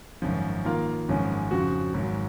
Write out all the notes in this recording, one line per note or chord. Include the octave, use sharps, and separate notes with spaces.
G#1 F#2 F3
D#3 A#3 F4 A#4 F5
G#1 F#2 F3 G#3 C#4
F2 C#3 F3 C4 F#4
G#1 G#2 F#3